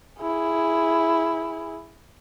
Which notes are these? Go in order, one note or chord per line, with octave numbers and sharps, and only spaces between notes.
E4 G#4